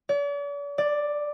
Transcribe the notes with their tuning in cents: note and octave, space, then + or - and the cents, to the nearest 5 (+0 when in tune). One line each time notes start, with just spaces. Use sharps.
D5 -45
D5 +5